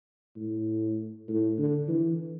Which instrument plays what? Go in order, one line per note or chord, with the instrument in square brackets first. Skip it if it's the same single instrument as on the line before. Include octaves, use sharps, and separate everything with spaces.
[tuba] A2
A2
D3
E3